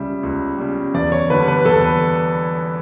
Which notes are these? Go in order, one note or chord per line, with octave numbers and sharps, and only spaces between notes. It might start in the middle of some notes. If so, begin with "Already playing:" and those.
Already playing: C#2 C#3 G3 E5
C#2
C#3 G3
E2 D5
C#5
D3 G3 B4
B4
E2 A4
B4